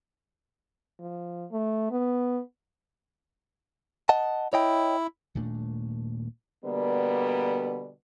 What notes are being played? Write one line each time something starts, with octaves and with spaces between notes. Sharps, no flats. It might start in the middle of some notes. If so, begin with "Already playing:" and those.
F3
A3
B3
D#5 F#5 A5
E4 C#5 D#5 G5
D#1 A#2 A3 D4
B2 D3 G3 A#3 B3